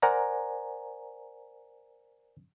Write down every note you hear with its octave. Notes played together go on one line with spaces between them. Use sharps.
A#4 C5 D5 F#5 G#5 A#5